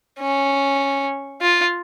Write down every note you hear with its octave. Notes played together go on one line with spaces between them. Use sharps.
C#4
F4